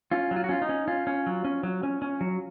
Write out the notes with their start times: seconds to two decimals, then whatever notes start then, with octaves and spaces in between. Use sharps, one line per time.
0.11 C#4 F4
0.31 F#3
0.36 F4
0.44 F#4
0.49 C#4 F4
0.62 D#4
0.69 C#4
0.88 C#4 F4
1.07 C#4
1.26 F#3
1.44 C#4
1.63 F#3
1.83 C#4
2.02 C#4
2.21 F#3